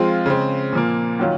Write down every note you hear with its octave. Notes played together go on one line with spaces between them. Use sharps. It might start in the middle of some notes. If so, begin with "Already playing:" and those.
Already playing: F3 G#3 C4 F4
C#3 G#3 C4
A#2 F3 A#3
D#3 F#3 C#4 F4